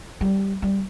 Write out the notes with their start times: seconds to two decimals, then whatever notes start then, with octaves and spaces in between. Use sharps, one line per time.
0.21 G3
0.62 G3